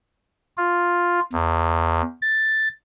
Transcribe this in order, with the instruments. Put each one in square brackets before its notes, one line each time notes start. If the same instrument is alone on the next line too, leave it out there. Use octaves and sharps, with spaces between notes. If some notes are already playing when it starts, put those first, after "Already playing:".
[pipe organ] F4
E2
A6